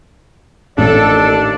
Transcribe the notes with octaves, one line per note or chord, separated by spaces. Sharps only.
A1 D#2 D4 A4 D5